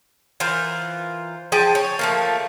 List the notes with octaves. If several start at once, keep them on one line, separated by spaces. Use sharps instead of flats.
E3 F4 A#4 C5
F3 G#4 G5 A5
C#5
F3 A3 A#3